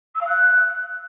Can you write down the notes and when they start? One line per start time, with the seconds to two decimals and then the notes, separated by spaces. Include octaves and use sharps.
0.14 E6
0.20 F5
0.26 F#6